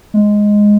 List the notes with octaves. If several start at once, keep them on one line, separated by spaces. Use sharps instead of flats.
G#3